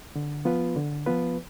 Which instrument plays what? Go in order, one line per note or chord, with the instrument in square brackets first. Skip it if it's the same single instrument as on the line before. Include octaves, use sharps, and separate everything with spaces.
[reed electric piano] D3
F3 B3 F4 B4
D3
F3 B3 F4 B4